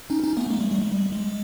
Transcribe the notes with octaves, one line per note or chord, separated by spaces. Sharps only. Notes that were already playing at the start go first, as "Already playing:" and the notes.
C#4 D#4
C#4 D#4
A3 B3
G#3 A#3
G3 A3
G3 A3
G#3
G3
G#3